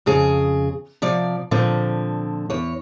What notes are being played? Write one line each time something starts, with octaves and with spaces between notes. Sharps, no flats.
F2 C#3 G#4
C3 F3 D5
A#2 D3 F3 C4
E2 C#5